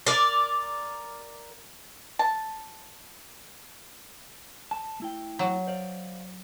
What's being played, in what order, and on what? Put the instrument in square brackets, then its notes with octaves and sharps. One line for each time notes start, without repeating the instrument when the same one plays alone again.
[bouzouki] A#4 D5
[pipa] A5
[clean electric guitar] A5
A3 E4 G5
[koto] F#3
[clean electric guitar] C5 D5 F5